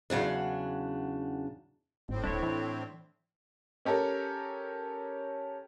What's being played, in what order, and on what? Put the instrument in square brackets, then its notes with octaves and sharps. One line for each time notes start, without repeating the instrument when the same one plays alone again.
[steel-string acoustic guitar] E2 C#3 F#3 D4
[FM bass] G#1 [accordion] A2 C4
[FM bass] D#1 [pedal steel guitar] D4 E4 C#5
[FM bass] E3
[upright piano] C#4 G4 A4 A#4